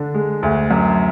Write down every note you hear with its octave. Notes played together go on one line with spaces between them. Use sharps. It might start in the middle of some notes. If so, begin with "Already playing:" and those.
Already playing: D3 D4
G#3
D2
F#2